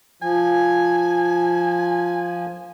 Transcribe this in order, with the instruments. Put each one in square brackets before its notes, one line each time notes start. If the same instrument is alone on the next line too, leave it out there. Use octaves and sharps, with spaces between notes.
[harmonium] F3 [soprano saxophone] G#5